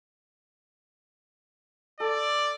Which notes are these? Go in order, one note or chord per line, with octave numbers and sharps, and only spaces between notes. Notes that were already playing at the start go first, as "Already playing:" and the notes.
A4 D5